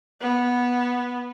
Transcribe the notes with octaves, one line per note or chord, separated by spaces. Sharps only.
B3